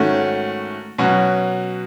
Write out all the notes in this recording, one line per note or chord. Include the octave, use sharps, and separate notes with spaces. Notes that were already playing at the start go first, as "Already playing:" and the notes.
Already playing: G#2 D#3 A3 C#4 F#4
B2 F#3 C#4 F#4